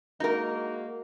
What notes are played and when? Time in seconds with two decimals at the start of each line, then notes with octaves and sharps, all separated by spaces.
0.20 G#3 A#3 D#4 F#4 A#4